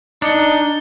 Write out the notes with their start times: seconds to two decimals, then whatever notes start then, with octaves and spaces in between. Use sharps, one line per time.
0.22 D4 D#4 D6 C#7 G7